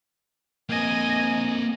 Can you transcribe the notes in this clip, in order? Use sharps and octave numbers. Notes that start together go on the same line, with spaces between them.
A#3 C4 D#5 G#5